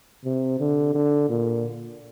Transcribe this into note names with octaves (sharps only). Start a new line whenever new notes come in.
C3
D3
D3
A#2